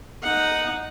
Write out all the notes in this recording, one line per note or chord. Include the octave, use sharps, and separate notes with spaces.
D#4 F#5